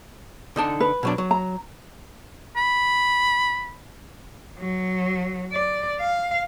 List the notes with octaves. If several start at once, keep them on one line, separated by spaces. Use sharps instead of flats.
D3 D#4 A5
B4
B2 F#3 D4
F#3
A#5
B5
F#3
D5
F5